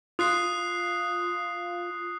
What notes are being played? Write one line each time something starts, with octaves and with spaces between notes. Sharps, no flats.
F4 D#6 F#6 C7